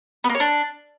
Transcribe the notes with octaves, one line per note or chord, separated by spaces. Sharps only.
B3
A#3
C#5
D4